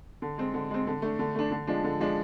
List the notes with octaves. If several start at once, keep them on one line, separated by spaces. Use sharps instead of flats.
D3
G#3 C4
D3
G#3 C4
D3
A3 D4
D3
A3 D4
D3
F3 G#3 D4
D3
F3 G#3 D4